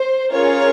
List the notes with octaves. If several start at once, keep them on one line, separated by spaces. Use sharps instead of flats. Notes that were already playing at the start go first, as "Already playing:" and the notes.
Already playing: C5
C#4 F4 G#4 A#4 C#5